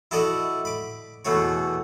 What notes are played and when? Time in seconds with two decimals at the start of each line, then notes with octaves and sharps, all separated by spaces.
0.11 E4 F#4 A4 D5 D#5
0.65 B5 D6
1.25 E2 B2 A3 F#4 C#5